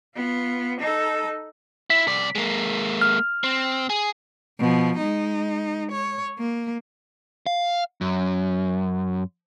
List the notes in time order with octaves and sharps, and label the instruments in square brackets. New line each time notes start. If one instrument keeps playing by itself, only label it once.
[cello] B3 F4
D#4 A4
[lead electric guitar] E4 [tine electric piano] B6
[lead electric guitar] C2 D5
G#3 A#3
[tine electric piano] F6
[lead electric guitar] C4
G#4
[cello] B2 F3
G#3 D#4
C#5
A#3
[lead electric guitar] F5
F#2